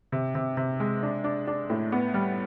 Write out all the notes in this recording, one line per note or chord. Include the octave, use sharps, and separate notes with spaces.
C3
C3
C3
G#3
D4
D4
D4
A2
B3
G3